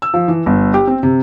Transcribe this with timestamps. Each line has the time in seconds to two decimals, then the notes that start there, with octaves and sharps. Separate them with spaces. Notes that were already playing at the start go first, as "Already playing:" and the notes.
0.02 E6
0.14 F3
0.28 E3
0.46 G1
0.74 G4
0.87 C4
1.03 C3